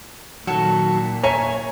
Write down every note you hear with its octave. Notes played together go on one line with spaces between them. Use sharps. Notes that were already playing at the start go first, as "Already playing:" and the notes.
A#2 D#3 F#3 F#4 A4
C#5 E5 G#5 A#5 C#6